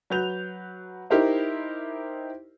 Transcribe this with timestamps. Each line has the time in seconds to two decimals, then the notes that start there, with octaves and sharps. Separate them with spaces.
0.10 F#3 B4 G6 F7
1.10 D#4 E4 G4 A#4 C5 D#5